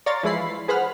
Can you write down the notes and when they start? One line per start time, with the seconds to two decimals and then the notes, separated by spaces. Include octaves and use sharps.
0.06 C#5 D5 F5 A#5 C6 A6
0.23 E3 F3 G#3 E4 B5 C7
0.68 G#4 B4 C5 F#5 B5 F6